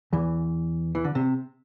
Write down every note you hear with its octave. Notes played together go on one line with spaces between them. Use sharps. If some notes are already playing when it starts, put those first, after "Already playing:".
E2 E3
E3
D3
C3